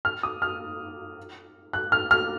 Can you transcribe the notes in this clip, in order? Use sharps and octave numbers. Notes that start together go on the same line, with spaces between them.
F6
D#6
F6
F#6
F6
F6